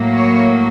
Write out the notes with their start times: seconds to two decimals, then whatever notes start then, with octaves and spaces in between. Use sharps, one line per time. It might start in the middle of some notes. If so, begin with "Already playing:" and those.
Already playing: A2 F#3 A#3
0.15 C#5